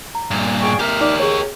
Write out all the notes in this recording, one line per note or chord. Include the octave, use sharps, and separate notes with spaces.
A#5
G2 A#2
G#4 G5 C#6
G4 A#4 E5 F6
D#4 D5 D6
G#4 C#5 C#6